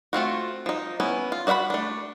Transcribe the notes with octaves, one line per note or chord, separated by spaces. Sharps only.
A3 C4 F4 F#4
F3 D#4
B3 C#4 E4
F4
F#4 D5 E5 F#5 B5
A3 D4